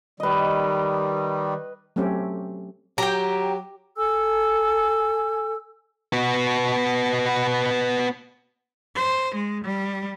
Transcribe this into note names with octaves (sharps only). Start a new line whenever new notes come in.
D#3 G3 B4 D#5
F#3 A3 C4 C#4 G4
F#3 G4 G5 A#5
A4 G#5 E6
B3 F#4
C5
G#3
G3